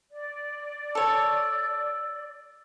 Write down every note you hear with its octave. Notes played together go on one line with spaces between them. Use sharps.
D5
A4 C#5 E6